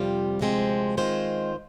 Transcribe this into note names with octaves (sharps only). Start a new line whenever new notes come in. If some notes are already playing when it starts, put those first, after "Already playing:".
Already playing: F2 C3 G3 C4 F4
D2 C3 F3 G#3 C4
D#3 G#3 C4 F4 C5